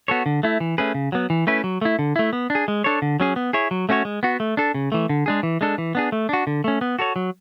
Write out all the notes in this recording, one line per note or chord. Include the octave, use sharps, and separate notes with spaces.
B3 F#4 A4 C#5
D3
A3 E4
E3
A3 C#4 G#4 B4
C#3
F#3 B3
E3
A3 C#4 E4 B4
F#3
A3 E4
D3
A3 E4
B3
D4
G#4
G#3
D4 A4 C#5
D3
F#3 C#4 G#4
B3
E4 G#4 C#5
F#3
A3 C#4 F#4 C#5
G#3
B3 F#4
A3
D4 A4
C#3
E3 A3
D3
G#3 D4 G#4
E3
G#3 D4 A4
E3
B3 D4 G#4
A3
D4 F#4
D3
A3 C#4
B3
F#4 A4 C#5
F#3